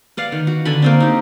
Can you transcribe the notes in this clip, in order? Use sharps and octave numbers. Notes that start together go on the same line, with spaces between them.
B4 D5 F5 F#5
D#3
F#4
D3 D4 G#5 B5
A#3 C4 D4
D#4 G4